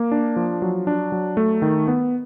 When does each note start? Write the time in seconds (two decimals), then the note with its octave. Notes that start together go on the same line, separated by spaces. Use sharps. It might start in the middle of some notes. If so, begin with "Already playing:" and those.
Already playing: A#3
0.12 D4
0.36 F3
0.62 F#3
0.87 D4
1.12 F#3
1.37 A3
1.62 D#3
1.88 B3